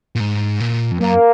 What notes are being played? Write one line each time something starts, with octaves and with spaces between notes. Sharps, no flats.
A#2
G#2
A#2
F2
F#2 A#3